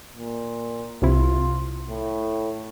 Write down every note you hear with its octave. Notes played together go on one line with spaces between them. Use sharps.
A#2
C2 C3 E4 F4
A2